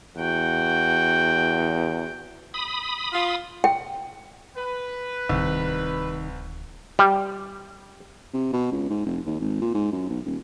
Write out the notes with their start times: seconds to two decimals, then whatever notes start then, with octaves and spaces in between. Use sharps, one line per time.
0.17 E2 F#4 G5
2.54 B5 D#6
3.13 F4
3.64 G5
4.56 B4
5.29 D1 C2 D#3
6.99 G3
8.33 C3
8.53 B2
8.72 C#2
8.90 G#2
9.06 F1
9.26 D#2
9.40 G#1
9.61 A#2
9.74 G#2
9.92 F#2
10.09 B1
10.25 D#1